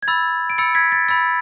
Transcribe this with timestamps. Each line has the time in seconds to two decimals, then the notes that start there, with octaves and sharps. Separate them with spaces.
0.03 G#6
0.08 B5 E6 A6
0.50 D7
0.58 B5 E6 A6 C#7
0.75 G#6 B6
0.92 A6
1.09 B5 E6 A6